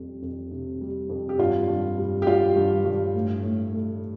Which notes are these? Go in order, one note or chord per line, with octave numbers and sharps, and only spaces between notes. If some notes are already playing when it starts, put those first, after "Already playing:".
Already playing: F2 G3
F2
C3
G3
F2
G4
G2 F4
G2
G3
G4
G3 F4
G2
G2
A2
A2
A3